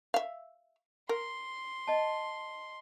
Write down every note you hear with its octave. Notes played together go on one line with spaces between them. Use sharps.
E5 F5
A#4 C6
D#5 A5